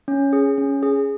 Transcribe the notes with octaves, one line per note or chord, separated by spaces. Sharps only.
C#4
G#4
C#4
G#4